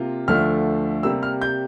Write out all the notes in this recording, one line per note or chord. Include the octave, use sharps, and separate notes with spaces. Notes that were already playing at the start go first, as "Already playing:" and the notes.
Already playing: C3 A#3 F4
D2 D3 F3 A3 F6
C3 G3 A#3 E6
F6
G6